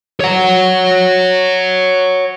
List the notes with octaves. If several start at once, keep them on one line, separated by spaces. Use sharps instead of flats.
C#5 F#5